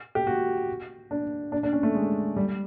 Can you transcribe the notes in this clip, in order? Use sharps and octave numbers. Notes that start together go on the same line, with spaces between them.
G4
F#4
D4
D4
D4
C#4
A3
G#3
G3